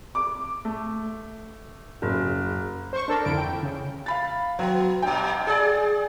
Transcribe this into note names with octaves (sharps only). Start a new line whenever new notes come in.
D6
A3
F#1
C5 C#6
D4 A4 A#4
F2 D3 E4 D7
G5
C#3
F5 B5 A6
F#3 B3
G2 A#2 G5
G#4 D5